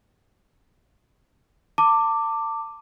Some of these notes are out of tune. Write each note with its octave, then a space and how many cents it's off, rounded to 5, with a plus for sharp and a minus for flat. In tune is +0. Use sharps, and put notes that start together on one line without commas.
A5 +35 D6 +0